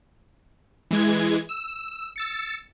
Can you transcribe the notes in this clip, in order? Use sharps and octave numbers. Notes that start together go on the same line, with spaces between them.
E3 G#3 G#6
E6
E6 A6 C#7